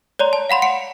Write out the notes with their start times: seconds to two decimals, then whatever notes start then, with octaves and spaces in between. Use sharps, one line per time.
0.19 C#5 D5 A#5 C6
0.33 A5
0.50 F5 F#5 B5 C6
0.62 F#5 C#7 D7